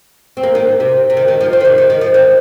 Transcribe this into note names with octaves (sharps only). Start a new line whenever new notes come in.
C4
A#3
D#3
C3
C3
D#3
D#3
F3
C4
D#3
C3
D#3
D#3
F3
D#3